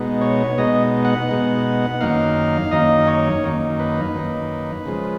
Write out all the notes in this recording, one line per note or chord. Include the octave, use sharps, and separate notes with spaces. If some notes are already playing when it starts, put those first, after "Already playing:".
Already playing: B2 G#3 B3 D#4
C#5
B2 G#3 B3 D#4 D#5
F#5
B2 G#3 B3 D#4
F#2 D#3 A#3 D#4 F5
F#2 D#3 A#3 D#4 D#5
C#5
F#2 D#3 A#3 D#4
B4
F#2 D#3 A#3 D#4
C#3 F3 G#3